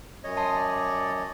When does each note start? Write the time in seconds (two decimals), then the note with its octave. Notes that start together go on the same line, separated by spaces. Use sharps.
0.24 F#2 C#5 D#5
0.37 A5 C6 D#6
0.56 D5